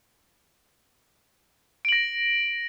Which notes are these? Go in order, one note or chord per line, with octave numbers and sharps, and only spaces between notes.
A#6 D7 F#7